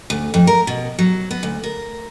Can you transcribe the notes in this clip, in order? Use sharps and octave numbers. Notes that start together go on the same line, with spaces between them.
D2
F2
A#4
B2
F#3
B3
D2
A#4